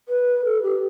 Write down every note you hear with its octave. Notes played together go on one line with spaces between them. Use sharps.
B4
A4
G4